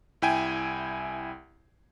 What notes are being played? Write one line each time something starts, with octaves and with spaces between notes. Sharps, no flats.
C2 E4 G5 G#5